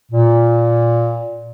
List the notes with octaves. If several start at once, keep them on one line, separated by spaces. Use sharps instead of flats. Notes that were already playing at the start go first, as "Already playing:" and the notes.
A#2